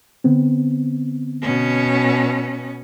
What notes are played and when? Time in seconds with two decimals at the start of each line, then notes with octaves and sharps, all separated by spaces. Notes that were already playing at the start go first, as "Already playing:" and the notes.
0.24 D3 B3 C4
1.42 B2 C#4